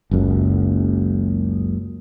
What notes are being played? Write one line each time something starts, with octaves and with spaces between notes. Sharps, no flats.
F#1 C#2 F#2